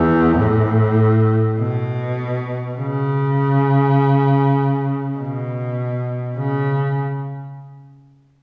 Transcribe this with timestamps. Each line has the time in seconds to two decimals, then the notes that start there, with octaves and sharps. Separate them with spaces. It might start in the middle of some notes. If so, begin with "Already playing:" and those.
Already playing: E2
0.38 A2
1.58 B2
2.78 C#3
5.18 B2
6.37 C#3